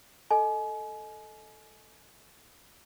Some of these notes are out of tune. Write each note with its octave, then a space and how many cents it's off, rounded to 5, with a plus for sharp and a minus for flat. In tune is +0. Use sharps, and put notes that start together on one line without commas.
A4 +0 D#5 +5 G#5 +35